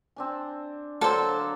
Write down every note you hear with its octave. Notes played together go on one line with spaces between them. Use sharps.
C4 D4 G#5
D3 F#3 A#3 A4 C5